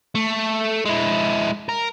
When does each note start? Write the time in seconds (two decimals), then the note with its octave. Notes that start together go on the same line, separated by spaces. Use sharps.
0.15 A3
0.85 G#3 E4
1.69 A#4